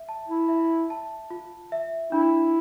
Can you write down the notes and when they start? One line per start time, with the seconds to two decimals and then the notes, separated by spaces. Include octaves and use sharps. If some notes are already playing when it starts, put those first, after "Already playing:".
Already playing: E5
0.09 A5
0.28 E4
0.48 E5
0.90 A5
1.30 F4
1.72 E5
2.12 D4 E4